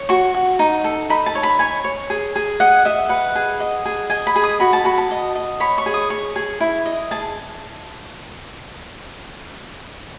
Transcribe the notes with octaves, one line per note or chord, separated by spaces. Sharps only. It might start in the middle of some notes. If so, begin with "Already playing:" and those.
Already playing: C#5
F#4 C#6
F#4
D#4
A4
D#4 B5
A5
C#5
B5
C#5 G#5
C#5
G#4
G#4
D#5 F#5
D#5 E5
B4 F#5
G#4
D#5
G#4
D#5 G#5
B5
G#4
D#6
F#4 B5
A5
F#4 B5
A5
D#5
D#5
C#5 B5
C#6
G#4
D#6
C#5 C#6
G#4
E4
D#5
G#4 A5